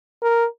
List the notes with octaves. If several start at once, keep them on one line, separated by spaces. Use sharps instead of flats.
A#4